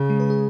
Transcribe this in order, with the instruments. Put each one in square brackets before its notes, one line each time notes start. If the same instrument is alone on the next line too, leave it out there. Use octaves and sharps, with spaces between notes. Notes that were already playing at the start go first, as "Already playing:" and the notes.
Already playing: [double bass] C#3
[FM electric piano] G#3
B4
G#4